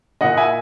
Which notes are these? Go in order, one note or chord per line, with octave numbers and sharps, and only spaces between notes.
A#2 A#3 D#5 F#5
E5 G#5